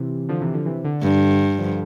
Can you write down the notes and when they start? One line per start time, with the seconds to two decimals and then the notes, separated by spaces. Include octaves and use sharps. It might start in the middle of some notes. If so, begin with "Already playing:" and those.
Already playing: C3 E3
0.29 D3 F3
0.40 C3 E3
0.53 D3 F3
0.66 C3 E3
0.84 D3
1.02 G2
1.58 D3 F3